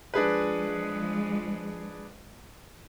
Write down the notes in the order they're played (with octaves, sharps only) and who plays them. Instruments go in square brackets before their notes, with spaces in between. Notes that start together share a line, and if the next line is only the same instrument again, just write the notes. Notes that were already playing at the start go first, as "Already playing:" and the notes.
[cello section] F3 G#3 [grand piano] D4 G#4 B4